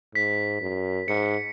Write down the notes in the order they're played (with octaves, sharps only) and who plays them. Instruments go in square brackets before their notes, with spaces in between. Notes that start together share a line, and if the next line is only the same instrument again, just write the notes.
[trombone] G#2 [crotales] B6
[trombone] F#2
[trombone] G#2 [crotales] C#7